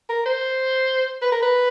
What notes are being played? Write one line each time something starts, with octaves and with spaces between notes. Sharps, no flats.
A#4
C5
B4
A#4
B4